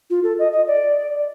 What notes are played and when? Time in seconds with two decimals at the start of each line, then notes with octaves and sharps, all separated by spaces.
0.10 F4
0.24 A4
0.39 D#5
0.52 D#5
0.67 D5